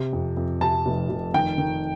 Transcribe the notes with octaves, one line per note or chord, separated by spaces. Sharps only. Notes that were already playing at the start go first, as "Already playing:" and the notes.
Already playing: C3
F2
F2
C3 A5
F1
F1
D#3 G5
D#3